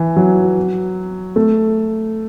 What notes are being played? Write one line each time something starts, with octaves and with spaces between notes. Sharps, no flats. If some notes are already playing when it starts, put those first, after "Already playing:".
Already playing: E3
F#3
A3